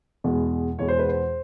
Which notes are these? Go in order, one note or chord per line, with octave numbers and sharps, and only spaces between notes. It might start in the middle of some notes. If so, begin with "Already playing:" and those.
E2 B2 G#3
E2 B2 G#3 C#5
C5
B4
C5